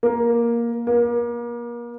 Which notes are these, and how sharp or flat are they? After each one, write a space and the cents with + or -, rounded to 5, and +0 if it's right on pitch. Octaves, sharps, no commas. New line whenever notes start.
A#3 +10
A#3 +35